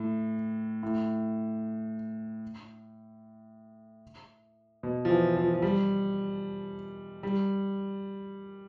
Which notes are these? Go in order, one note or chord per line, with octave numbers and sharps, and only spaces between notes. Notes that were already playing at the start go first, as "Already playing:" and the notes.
Already playing: A2
A2
B2
F3
E3
F3
F3
G3
G3